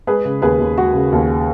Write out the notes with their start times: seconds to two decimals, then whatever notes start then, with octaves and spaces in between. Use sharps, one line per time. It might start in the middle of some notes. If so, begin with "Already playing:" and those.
0.07 G#3 G#4 B4
0.25 C#3
0.42 D#2 G#4 B4
0.60 D#2
0.78 G#3 F#4
0.94 C#3
1.12 D#2